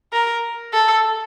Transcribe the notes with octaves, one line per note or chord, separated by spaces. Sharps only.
A#4
A4